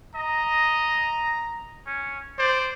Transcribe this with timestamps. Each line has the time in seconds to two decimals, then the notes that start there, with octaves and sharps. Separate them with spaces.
0.15 D#5 A#5
1.87 C#4
2.39 C5 D5